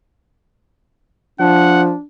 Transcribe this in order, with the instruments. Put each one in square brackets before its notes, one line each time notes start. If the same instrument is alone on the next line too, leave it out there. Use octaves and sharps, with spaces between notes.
[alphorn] F3 [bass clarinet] D4 [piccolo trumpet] F#5